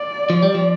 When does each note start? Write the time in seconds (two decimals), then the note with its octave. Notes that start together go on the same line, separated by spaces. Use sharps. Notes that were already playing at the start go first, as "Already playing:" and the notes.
Already playing: D5
0.30 F3
0.43 G3
0.54 F3